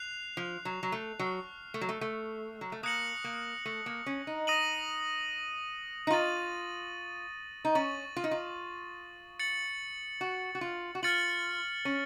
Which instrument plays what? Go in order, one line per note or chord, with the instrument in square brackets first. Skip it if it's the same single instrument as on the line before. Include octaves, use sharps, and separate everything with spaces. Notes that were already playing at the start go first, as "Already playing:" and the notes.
Already playing: [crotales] F#6 C7 F7
[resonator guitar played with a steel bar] F3
F#3
F#3
A3
[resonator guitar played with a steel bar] F#3 [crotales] C#6 F6 C7
[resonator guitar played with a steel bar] A3
F#3
A3
A3
F#3
A3
[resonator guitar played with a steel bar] A#3 [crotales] D#6 F#6 A#6 C#7 F#7
[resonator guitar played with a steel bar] A#3
A3
A#3
C#4
D#4
[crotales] D#6 A#6 D#7 F#7
[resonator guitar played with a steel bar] D#4
[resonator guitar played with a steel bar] F4 [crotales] C#6 A6 D#7 F#7
[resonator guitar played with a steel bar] D#4
[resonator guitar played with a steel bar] C#4 [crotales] C#6 A6 D#7 F#7
[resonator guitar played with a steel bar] F4
D#4
F4
[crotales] A6 C#7 F#7
[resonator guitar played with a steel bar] F#4
F#4
F4
F#4
[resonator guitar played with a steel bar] F4 [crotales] F6 A6 C#7 F#7
[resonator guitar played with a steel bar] C#4